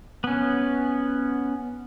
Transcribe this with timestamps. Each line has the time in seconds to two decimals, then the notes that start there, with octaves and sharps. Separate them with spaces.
0.24 B3 C#4